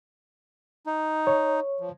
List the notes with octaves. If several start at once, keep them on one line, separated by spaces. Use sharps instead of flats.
D#4
C#5
F3